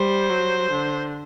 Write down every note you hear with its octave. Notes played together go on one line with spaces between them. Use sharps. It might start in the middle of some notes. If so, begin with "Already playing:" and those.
Already playing: G3 C5
F#3
D3